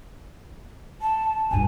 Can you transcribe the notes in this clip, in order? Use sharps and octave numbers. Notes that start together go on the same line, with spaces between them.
A5
A#1 G2 G#5